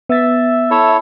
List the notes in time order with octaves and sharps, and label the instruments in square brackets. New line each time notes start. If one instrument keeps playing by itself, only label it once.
[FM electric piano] B3 A6 [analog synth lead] E5
[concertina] E4 A4 C#5